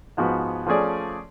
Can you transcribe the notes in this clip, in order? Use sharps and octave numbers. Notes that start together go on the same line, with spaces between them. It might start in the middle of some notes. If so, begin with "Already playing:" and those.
G#2 F3 B3 F#4 B4
F3 A3 C#4 G#4 D5